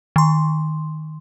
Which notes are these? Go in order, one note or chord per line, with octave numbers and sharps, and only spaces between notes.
D#3 C6